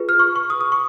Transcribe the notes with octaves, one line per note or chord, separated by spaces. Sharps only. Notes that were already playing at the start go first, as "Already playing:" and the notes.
Already playing: F4 G#4 B4
F6
C#6
C#6
D#6
D#6
C#6